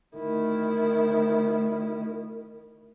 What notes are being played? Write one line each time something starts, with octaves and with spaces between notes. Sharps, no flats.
D2 D#3 E4